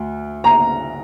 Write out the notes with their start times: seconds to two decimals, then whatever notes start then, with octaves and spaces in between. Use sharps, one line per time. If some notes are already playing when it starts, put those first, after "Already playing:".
Already playing: D2
0.44 A#5